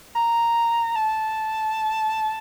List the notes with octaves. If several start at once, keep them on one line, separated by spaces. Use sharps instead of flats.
A#5
A5